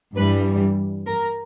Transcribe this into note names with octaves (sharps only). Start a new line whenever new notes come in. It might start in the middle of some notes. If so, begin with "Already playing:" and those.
G2 E3 G3 B4
A#4